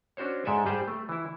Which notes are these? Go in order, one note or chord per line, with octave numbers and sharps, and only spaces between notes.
C#4 D4 F#4 C5 C#5
G#2 G#3 A4 D5 E5 G#5
G3 G4 G#4 C5 G5 A5
A3
E3 E4